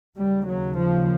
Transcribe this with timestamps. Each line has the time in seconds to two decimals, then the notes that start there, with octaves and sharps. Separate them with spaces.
0.17 D#2 C#3 G3
0.48 F#3
0.77 F3